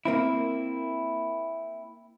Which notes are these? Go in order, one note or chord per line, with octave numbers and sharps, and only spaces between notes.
A#3 C4 E4